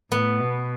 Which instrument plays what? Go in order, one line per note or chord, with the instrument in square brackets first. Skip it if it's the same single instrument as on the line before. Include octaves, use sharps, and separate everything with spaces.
[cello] A2 [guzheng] B3
[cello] B2